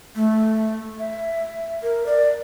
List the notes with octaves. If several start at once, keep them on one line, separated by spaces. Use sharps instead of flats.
A3
E5
A#4
D5